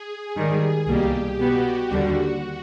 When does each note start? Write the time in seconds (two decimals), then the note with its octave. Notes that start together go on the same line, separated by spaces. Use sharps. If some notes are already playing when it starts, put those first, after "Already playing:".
Already playing: G#4
0.36 G#2 D#3 G3 G#4
0.87 C2 B2 G3 A#3 G4
1.39 B2 G3 B3 F#4
1.91 D#2 D3 G3 F#4